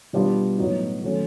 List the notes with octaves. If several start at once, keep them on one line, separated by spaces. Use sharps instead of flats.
B2 G3 B3 D4 F4
A2 F#3 B3 D#4 F#4
D#3 F#3 A3 C#4